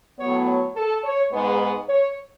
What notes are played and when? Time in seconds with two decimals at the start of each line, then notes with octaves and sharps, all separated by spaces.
0.19 A2 F#3 B3 C#5
0.47 C#5
0.76 A4
1.04 C#5
1.32 G#2 G#3 B3 B4
1.89 C#5